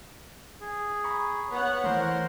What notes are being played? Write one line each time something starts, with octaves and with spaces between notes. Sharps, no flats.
G#4
A#5 B5 C#6
B3 B4 C#5 F#5
E3 A3 A#4 C5 C6